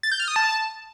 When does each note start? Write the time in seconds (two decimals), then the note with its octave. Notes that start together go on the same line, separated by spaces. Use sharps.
0.03 A6
0.12 G6
0.20 F6
0.28 D#6
0.36 A5